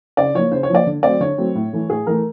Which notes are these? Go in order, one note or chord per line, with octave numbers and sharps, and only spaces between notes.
C#3 D5
F3 A#3 C#5
C#3 C5
C#5
F3 A#3 D5
D3
F#3 A3 C4 D5
D3 C#5
F#3 A3 C4
A2
E3 A3
A2 G#4
E3 A3 A#4